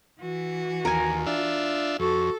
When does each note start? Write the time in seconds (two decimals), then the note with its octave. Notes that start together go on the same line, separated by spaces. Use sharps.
0.20 E3 F#4
0.85 D#2 A#4 G#5
1.27 D4 F4 E5
1.99 F2 F#4 A4